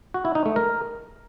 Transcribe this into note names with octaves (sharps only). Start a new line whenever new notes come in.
F#4
E4
D#4
A3
A#4